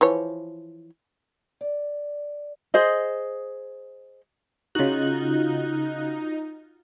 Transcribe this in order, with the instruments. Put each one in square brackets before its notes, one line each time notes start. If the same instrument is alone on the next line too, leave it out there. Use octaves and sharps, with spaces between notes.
[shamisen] E3 F3 C#5
[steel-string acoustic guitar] D5
[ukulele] G#4 C5 D#5
[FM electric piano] C#3 F#6 [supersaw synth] D#4 [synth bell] F4 F#4